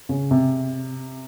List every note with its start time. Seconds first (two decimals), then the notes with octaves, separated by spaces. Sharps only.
0.09 C#3
0.31 C3